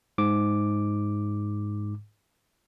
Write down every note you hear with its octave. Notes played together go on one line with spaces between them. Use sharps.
G#2 D6